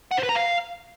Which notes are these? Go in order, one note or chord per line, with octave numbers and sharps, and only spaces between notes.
F#5
C5
B4
A#5
F5